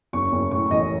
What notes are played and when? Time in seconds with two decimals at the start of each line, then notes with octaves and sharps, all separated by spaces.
0.13 F#1 C#6
0.32 F#1
0.51 A2 C#6
0.71 A1 D#5